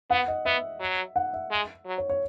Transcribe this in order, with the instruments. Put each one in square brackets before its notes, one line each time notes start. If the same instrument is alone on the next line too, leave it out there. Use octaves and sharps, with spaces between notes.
[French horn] B3 [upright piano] F#5
[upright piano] D#5
[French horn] B3 [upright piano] E5
[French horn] F#3
[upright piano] F#5
E5
[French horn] G#3
F#3
[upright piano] C#5
C#5